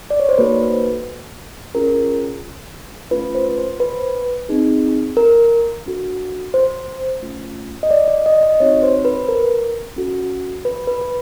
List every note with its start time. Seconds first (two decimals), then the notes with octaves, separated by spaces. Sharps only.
0.10 D5
0.20 C#5
0.29 C5
0.38 A#3 D#4 F#4 A4 B4
1.75 C#4 F4 G#4 A#4
3.11 A3 C#4 F4 A4 B4
3.35 C5
3.58 C5
3.80 B4
4.49 C4 D#4 G#4
5.17 A#4
5.86 D4 F#4 A4
6.54 C5
7.22 A3 C#4 F4
7.83 D#5
7.91 D5
8.08 D#5
8.26 D#5
8.43 D#5
8.60 C4 D#4 F#4 C#5
8.83 C5
9.05 B4
9.29 A#4
9.96 C#4 F#4 A4
10.65 B4
10.87 B4
11.02 B4